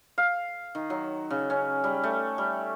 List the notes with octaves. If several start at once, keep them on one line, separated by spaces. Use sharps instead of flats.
F5
D#3
F#3
C#3
C#4
G3
A3
G3